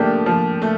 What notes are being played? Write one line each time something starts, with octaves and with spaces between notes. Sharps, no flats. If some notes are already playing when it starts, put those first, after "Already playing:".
Already playing: F3 A3 A#3 D4 G4
F3
A3